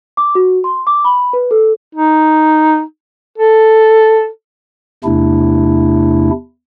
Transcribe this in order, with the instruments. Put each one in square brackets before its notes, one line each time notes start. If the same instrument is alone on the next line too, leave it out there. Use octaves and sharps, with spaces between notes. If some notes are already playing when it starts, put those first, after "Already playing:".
[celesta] D6
F#4
C6
D6
B5
B4
A4
[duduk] D#4
A4
[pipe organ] E2 C3 A3 D4 E4